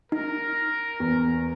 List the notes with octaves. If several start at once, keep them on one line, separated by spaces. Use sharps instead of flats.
D#4 A#4
E2